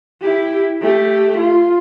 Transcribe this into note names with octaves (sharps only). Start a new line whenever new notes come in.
E4 G4
A3 G4
F4